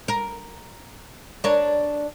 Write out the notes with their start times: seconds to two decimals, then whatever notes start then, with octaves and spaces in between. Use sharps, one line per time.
0.08 A#4
1.44 D4 A#4 C#5